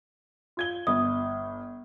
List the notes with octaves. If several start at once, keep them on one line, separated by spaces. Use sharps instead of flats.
F4 G#6 G7
G1 D#6